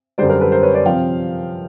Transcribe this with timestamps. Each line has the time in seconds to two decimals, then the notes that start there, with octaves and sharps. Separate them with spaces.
0.18 F#2 D3 G3 C5 D5
0.29 A#4 C5
0.41 A4 B4
0.52 A#4 C5
0.63 B4 C#5
0.74 C5 D5
0.86 C3 F3 F5 G5